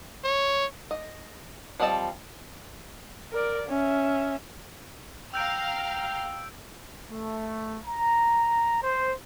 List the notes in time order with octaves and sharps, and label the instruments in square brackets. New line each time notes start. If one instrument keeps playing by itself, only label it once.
[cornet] C#5
[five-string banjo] D#5
F3 G3 C4 D#5 A5
[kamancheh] A#4 D5
C#4 E5
[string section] F5 A#5 F6 [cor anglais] G5 [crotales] E6 G6 D7
[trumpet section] A3
A#5
C5